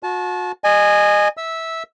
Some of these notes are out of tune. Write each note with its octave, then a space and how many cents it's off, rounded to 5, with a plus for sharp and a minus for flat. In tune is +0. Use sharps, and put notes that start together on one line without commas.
F#4 -35 A5 -30
D#5 -25 G#5 +0
E5 -15 E6 -10